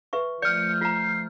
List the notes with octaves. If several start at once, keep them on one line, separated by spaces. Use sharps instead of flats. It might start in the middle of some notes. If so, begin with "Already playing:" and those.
B4 E5 C#6
F3 A3 D5 F6 G6 C#7
F4 A#5 C7